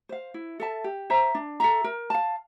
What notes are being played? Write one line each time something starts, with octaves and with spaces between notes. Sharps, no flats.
C5 F5
E4
A4 E5 A5
G4
C5 E5 A#5
D4
A4 E5 A#5
A#4
F5 A5